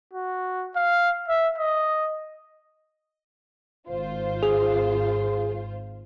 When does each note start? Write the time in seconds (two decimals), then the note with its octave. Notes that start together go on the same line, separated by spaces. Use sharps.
0.13 F#4
0.76 F5
1.28 E5
1.58 D#5
3.89 G#1 F4 C5
4.43 G#4